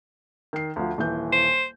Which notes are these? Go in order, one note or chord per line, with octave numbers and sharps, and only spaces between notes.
D#3 C7
D2 F3
D#1 E3 G6
C5